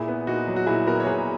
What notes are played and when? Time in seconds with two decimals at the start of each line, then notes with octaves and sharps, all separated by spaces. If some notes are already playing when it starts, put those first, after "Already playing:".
Already playing: A#2 E4 G#4
0.08 B3
0.27 A#2 D#4 F#4
0.48 F#3
0.56 F#4
0.66 A#2 E4 G#4
0.86 B3 F#4 A#4
1.00 C#5
1.06 A#2 G#4 B4